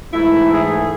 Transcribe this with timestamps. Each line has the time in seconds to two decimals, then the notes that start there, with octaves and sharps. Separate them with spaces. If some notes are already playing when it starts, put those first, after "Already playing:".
0.13 G#2 E3 A3 E4
0.51 G#4